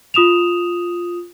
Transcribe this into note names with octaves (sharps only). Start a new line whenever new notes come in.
F4 D#6 E7 F7